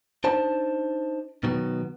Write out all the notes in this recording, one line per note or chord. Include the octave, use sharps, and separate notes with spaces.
D4 D#4 C5 A5
B2 D#3 F#3 B3